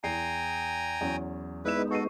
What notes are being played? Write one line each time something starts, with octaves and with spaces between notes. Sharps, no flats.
E2 G5 G#5 A#5 C7
E2 F#3 C#4
G#3 B3 D#4 E4 B4 D5 E7
F#4 A4 C#6 C7 D#7